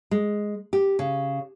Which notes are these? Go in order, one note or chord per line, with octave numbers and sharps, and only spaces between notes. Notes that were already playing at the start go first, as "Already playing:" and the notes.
G#3
G4
C#3